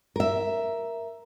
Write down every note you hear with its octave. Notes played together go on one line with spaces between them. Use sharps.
A#4 E5